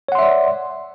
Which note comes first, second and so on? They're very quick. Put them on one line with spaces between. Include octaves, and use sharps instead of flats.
C#5 F#5 C6 E5 D5